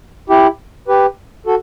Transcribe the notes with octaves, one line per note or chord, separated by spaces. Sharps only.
E4 G4
G4 B4
F#4 A4